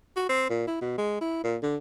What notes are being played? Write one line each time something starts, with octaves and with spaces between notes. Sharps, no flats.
F#4
C4
A#2
E4
B2
G#3
E4
A#2
D3